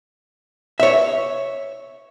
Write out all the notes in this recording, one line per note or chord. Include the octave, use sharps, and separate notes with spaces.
C#5 E5